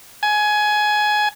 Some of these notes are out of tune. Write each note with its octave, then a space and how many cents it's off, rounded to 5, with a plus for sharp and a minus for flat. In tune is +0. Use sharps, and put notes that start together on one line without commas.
G#5 +20